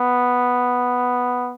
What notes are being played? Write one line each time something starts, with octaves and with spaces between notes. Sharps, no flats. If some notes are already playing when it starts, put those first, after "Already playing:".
Already playing: B3